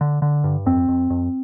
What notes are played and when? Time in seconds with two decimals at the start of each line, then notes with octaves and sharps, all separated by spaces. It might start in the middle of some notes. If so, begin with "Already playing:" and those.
0.01 D3
0.22 D3
0.44 G2
0.66 F2 C4
0.88 F2
1.10 F2